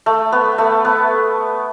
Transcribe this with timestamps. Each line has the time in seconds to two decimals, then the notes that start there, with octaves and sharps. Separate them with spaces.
0.06 A3
0.32 B3
0.58 A3
0.85 B3